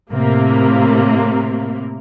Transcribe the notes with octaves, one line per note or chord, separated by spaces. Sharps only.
A2 C3 A#3